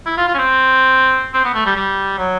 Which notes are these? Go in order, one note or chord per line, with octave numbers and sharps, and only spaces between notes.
E4
F4
F4
C#4
C4
C4
B3
A3
G3
G3
F#3